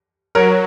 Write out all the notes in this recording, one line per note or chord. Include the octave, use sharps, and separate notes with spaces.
F#3 A#4 C#5